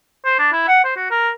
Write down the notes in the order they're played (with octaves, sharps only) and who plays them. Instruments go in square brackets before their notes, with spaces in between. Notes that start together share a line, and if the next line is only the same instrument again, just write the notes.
[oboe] C5
D4
E4
F#5
C5
F#4
A#4